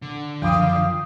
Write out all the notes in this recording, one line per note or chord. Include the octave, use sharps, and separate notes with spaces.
D3
F#2 F3 F5 G5 D6 D#6